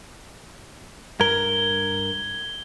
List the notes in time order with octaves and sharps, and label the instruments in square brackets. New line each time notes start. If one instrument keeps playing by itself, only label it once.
[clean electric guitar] G2 A#4 [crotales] G#6 G7